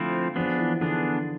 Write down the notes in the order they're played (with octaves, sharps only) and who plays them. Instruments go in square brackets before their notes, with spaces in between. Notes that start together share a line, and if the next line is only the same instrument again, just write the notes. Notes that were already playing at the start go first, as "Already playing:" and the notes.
Already playing: [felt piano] D3 [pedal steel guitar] F3 A3 C4 E4
[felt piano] F3 [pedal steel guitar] B3 D4 G#4
[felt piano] E3
[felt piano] D3 [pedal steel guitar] B3 D4 G#4